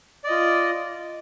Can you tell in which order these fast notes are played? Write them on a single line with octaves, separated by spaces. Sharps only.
D5 D#5 F4